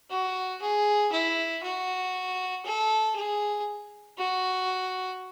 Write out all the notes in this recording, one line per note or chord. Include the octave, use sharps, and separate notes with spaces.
F#4
G#4
E4
F#4
A4
G#4
F#4